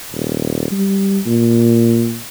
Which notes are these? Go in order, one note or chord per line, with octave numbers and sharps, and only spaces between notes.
D#1
G3
A#2